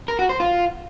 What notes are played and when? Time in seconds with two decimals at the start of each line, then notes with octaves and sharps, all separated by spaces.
0.08 A#4
0.19 F#4
0.29 C5
0.40 F4